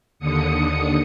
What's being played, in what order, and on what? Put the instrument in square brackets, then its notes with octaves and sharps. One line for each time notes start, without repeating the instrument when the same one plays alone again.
[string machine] D#2 D3 D#6 C#7